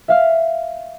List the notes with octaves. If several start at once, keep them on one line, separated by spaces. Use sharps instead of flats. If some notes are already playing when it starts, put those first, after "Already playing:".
E5 F5 F6